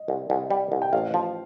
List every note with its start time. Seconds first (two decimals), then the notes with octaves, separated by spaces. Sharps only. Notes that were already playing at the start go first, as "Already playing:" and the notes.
Already playing: D#5
0.08 C2
0.30 C2
0.50 G3
0.72 C2
0.82 G5
0.93 A1 F5
1.14 F3